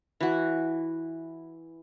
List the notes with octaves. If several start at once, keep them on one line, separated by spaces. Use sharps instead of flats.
E3 F#4